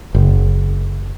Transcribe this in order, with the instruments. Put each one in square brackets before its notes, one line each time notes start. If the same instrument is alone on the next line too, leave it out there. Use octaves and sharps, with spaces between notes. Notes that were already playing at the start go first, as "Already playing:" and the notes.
[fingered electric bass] F#1